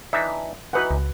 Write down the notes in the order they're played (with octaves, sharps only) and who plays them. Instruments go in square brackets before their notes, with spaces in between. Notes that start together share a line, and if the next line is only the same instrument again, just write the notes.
[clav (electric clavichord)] E3 D4 D#4 [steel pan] E5
[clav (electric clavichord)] E3 D#4 [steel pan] F#4 B4 F#5
[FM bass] C#2